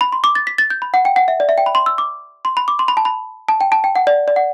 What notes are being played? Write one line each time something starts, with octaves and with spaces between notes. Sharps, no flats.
B5
C6
D6
A6
B6
A6
G6
B5
F#5
G5
F#5
E5
D5
E5
G5
B5
C6
E6
D6
C6
B5
D6
C6
B5
A5
B5
A5
G5
A5
G5
F#5
D5
D5
F#5